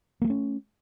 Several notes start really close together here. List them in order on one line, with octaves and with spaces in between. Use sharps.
A#3 G3 A3 C#4